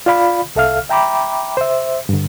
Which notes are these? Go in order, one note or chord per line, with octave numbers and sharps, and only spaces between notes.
F4 D5 F5 B5
C2 A4 E5 F5 F6
E5 G5 A#5 B5 D6
C5 E5
G2 D3